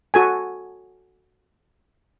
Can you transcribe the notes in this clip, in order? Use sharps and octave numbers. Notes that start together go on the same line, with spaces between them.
F#4 A4 G#5